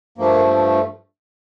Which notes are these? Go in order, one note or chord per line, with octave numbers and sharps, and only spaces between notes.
G2 F3 A3 A#3